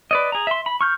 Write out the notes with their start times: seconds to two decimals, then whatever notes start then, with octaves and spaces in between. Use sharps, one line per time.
0.11 B4 D5 D#5
0.32 G#4 A#5
0.47 E5 C6
0.66 B5
0.81 C#6 F6 G6